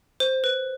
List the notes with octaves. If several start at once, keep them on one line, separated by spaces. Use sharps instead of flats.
C5
B4